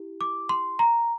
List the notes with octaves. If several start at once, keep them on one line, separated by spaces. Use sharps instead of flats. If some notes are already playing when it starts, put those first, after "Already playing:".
Already playing: E4 G4
D6
C6
A#5